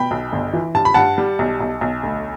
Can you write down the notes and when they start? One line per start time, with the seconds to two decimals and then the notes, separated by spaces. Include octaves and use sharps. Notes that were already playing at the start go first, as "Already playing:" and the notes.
Already playing: B2 G5 B5
0.11 B1
0.32 G1
0.53 E3
0.75 G2 A5
0.85 B5
0.94 G2 F#5 A5
1.18 G3
1.39 B1
1.60 B1
1.81 B1
2.03 D2